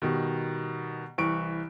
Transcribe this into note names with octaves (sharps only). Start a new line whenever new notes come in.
B2 D#3 G3
C2 E3 C#6 D7